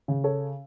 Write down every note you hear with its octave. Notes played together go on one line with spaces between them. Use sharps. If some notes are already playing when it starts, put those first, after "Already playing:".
C#3
A4 C#5